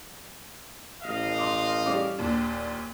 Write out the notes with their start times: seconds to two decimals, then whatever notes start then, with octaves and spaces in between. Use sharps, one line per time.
1.03 A1 D#5 F5
1.39 C6 D6
1.86 G3 C#4 D6
2.18 D#2 A#2 D4